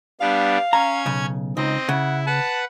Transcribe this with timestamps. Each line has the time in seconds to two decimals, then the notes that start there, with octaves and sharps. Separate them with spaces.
0.21 G3 B3 D4 F5
0.73 C#4 A#5 G#6
1.06 B1 C#3
1.57 C#2 C4 D#4 D#5
1.89 C#3 E4 F#5
2.27 B4 F#5 A5